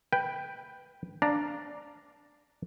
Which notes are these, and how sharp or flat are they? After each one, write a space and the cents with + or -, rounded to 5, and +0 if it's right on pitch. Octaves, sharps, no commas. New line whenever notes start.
B4 +0 G5 +0
D4 +0 F5 +0 A#5 +0